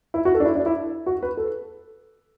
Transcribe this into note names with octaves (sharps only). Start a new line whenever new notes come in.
E4
F#4
A4
D4
E4
D4
E4
F#4
B4
A4